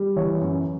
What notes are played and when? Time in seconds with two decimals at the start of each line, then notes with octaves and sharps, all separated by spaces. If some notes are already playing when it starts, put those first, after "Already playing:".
Already playing: G3
0.16 E3 C#5
0.41 F#2